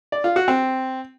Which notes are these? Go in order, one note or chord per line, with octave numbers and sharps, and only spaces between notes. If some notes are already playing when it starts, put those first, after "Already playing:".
D5
F4
F#4
C4